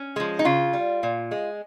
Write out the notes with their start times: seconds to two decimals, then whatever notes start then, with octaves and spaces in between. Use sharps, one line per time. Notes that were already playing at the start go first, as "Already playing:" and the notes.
Already playing: C#4
0.16 F3 G#3
0.39 D#4
0.45 C#3 F4
0.73 G3
1.03 A#2
1.31 G#3